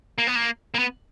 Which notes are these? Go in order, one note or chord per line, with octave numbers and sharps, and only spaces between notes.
A#3
B3
A#3
A#3
B3